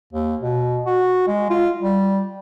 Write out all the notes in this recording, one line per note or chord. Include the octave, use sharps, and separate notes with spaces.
D#2
B2
F#4
G#3
F4
G3